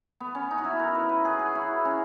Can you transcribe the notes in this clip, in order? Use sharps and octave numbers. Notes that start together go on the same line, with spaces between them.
B3
C#4
D#4
F#4
E4
A#4
B4
B4
G#4
F#4
E4
C#4